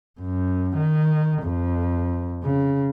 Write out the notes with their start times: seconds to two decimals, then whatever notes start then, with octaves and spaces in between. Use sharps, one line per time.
0.20 F#2
0.76 D#3
1.43 F2
2.43 C#3